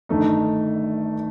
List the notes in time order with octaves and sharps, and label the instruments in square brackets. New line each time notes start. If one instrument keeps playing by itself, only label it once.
[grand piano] G1 G2 D#3 A3 D#4